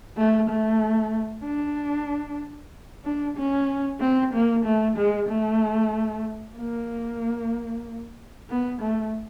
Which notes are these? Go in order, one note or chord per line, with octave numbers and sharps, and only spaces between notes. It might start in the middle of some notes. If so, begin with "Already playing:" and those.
A3
A3
D4
D4
C#4
C4
A#3
A3
G#3
A3
A#3
B3
A3